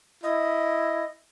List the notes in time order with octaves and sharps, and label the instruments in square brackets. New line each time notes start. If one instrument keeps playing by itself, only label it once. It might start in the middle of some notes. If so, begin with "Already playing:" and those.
[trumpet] E4 [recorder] D#5